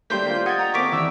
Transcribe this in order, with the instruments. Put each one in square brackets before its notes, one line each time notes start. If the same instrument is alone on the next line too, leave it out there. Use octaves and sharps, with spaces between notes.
[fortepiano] D#3 A3 A#3 [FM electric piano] G3 C5 B6 [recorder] G6
[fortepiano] A#3 D4 F4
[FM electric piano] D#5 G5 [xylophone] F#5 A6 [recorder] G#6
[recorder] A#5
[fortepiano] A#3 C4 A4 [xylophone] C#6 B6 D7 [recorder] D6
[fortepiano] E2 G4 [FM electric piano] D5 [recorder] E6